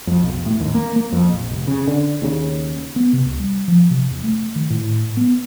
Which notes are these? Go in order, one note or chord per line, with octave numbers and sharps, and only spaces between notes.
F2
B1
E1
A2
D#2
A#3
A#3
F2
A#1
F1
C#3
D3
D#2 C#3
B3
C3
C#2
G3
F3
C3
E1
A3
D#3
A2
B3